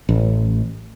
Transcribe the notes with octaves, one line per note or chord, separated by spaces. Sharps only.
A1